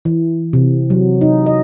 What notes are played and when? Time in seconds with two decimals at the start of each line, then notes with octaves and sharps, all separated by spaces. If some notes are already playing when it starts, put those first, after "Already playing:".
0.05 E3
0.53 C3
0.90 F#3
1.21 D#4
1.46 D#5